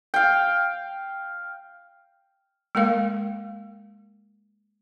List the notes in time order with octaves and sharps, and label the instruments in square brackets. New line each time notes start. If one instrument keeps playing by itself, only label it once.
[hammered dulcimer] F5 G5
[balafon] G#3 A#3 A#4 F5